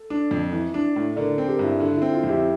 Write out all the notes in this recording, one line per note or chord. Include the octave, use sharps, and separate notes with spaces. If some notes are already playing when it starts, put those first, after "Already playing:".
Already playing: A4
D4
F2
E3
D4
A2
D3 A#4 D5
C4
G4 A#4
G2
E4
D3 E4
E4
C4
F4
F2
E4 G4